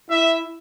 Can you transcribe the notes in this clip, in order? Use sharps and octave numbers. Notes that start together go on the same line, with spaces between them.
E4 E5